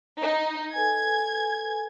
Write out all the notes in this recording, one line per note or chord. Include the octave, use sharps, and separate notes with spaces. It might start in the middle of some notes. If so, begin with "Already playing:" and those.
D#4
A4 B4 G#5 G#6